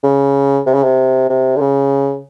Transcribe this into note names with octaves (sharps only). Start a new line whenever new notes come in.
C#3
C3
C#3
C3
C3
D3
C#3